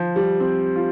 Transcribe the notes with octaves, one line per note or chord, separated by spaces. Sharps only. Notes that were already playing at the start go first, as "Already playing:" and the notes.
Already playing: F3
G3
C4
F4